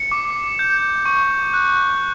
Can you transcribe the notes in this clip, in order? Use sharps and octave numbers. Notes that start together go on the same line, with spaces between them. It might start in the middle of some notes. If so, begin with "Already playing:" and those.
Already playing: C#7
D6
G6
C#6
F#6